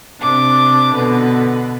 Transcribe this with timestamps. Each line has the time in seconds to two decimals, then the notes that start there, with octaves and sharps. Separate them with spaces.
0.20 C3 D4 D6
0.93 B2 D3 B4